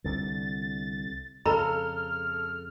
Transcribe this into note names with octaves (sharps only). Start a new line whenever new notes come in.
C2 D3 A6
F2 C#3 A4 A#5 B5 F6